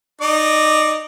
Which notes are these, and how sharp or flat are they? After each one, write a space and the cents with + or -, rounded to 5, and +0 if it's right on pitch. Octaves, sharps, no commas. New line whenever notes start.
D#4 -15 D5 +0 D6 +0